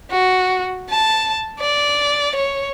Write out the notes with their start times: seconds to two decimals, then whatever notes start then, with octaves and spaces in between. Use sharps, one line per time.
0.11 F#4
0.90 A5
1.60 D5
2.35 C#5